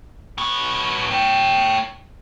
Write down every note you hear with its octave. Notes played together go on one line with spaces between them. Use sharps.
B3 C#5
C#5 G5